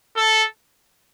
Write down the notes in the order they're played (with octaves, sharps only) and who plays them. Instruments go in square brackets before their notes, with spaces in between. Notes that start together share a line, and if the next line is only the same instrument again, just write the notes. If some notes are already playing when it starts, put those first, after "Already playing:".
[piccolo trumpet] A4